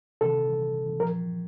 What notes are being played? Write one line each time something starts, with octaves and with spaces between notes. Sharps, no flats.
C3 D#3 A4
A#2 F3 A#4